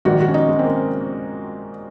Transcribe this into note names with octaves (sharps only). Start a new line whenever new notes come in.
A#1 G#2 D#3 F#4
F#4
C#4
D#4
G#3
C4
A#3